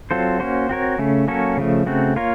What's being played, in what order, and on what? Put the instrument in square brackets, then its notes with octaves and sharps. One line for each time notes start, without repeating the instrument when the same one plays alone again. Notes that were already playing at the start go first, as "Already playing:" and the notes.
[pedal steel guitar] F#3 C4 F4 A4 C5
A#3 C#4 F#4 C5
C4 F#4 A#4 C#5
C#3 A3 C#4
F#3 A#3 C#4 A4 C#5
C#3 F3 A3
C#3 A3 C4 F#4
A#3 F4 A#4 C#5